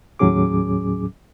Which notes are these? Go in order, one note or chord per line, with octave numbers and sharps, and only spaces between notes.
D#2 A2 F#3 C#4 G#4 D6